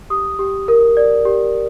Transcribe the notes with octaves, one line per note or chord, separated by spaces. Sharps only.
G4 D#6
G4
A#4
D5
G4